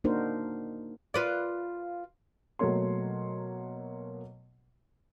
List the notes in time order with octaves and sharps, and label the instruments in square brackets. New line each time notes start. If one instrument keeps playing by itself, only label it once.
[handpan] A#3 D4 D#4 F#4 A#4 C5
[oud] F4 B4 D5
[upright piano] B2 F#3 A3 A#3 C#5 C6